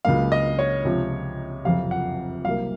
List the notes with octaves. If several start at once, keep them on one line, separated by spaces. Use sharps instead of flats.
C#2 C#3 F#3 A#3 F5
D#5
C#5
C#2 C3 F3
F#1 F2 C3 F5
F#5
C2 C3 F#3 A#3 F5